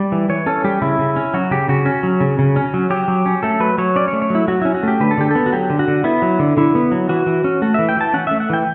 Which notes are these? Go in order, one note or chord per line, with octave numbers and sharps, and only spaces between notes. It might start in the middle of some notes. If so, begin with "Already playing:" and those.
Already playing: G3 D5
E3
E3 C#5
C#4 A4
G3 G4
C#3 E4
C#3
C#4
F#3 F#4
C#3 G4
C#3 F#4
C#4
F#3
C#3
C#3
C#4
F#3
F#3 G4
F#3
C#4
A3 A4
F#3 B4
F#3 C#5
C#4 D5
C#5
A3
C#5
F#3 E4
F#3 F#4
C#4 E4
F#4
A3 G4
D3 B4
A4
D3 G4
B3 A4
F#4
F#3 G4
D3
F#4
D3
B3 E4
F#3
D3
D3 E4
B3
F#3
E3 F#4
E3
C#4
A3 F#4
E3 E5
G5
E3 A5
C#4 F#5
A3 E5
F#5
E3 G5